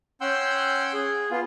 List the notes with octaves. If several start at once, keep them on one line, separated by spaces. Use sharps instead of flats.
C#4 F#5 G5 C6 E6 G6
G#4
B3 F4